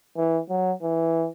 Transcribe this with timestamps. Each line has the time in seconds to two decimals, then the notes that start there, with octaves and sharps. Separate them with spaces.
0.17 E3
0.50 F#3
0.82 E3